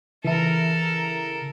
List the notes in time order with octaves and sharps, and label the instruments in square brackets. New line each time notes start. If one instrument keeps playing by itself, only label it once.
[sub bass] C#3 [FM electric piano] E3 E4 [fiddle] A4 A#4